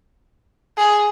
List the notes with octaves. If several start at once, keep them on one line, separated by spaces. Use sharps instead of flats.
G#4